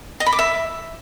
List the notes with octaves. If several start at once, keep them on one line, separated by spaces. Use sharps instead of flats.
D#5
B5
D6
E5